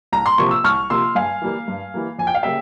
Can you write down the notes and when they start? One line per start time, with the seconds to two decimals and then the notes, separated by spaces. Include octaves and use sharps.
0.13 C2 A#5
0.26 C6
0.38 C3 F3 A#3 C#6
0.51 E6
0.64 C2 C#6 F6
0.90 C3 F3 A#3 C6 E6
1.15 G2 F5 G#5
1.42 E3 G3 A#3
1.68 G2
1.94 E3 G3 A#3
2.19 F2 G#5
2.27 G5
2.34 F5
2.43 C#3 G3 A#3 E5 G5